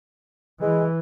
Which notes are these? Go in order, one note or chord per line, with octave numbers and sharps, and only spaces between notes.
E3 G#3